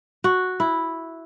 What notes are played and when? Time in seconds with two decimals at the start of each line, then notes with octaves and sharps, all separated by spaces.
0.24 F#4
0.60 E4